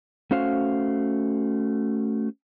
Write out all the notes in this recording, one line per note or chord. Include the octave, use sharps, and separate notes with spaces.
A3 C#4 F#4 C5 F5